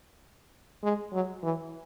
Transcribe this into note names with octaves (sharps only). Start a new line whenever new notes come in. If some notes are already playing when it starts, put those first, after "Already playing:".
G#3
F#3
E3